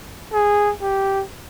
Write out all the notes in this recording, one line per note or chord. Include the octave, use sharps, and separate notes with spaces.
G#4
G4